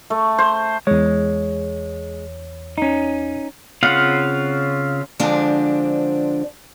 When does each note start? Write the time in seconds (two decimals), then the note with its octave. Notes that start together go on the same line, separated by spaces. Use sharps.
0.10 A3
0.39 C5
0.87 E2 G#3 C#5
2.78 C#4 D#4
3.83 C#3 C4 F4 F5 F#5
5.20 D3 F3 G#3 C4 D4 D5